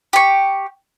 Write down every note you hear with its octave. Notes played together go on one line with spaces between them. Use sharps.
G4 C#6